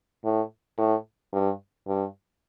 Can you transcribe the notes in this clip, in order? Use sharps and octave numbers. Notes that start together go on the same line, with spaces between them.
A2
A2
G2
G2